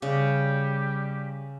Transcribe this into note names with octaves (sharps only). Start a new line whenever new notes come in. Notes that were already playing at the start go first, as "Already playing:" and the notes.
C#3 G3 G4